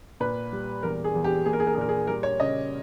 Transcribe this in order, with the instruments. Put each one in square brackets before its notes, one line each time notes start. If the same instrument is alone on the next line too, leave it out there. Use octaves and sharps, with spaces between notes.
[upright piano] A#2 B4
G3
E2 A#4
G#4
E2
G4
A#3 G#4
A#4
G#4
A#4
G#4
A#2 A#4
G#4
G3 A#4
C#5
C#3 D#5